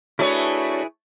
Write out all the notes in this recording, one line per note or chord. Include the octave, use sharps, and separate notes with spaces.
A3 D4 E4 F#4 G#4 B4 C#5 D5